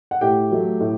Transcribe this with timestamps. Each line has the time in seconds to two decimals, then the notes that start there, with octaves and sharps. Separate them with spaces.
0.11 F#5
0.21 A2 G4 G5
0.52 F#3 A3
0.80 A2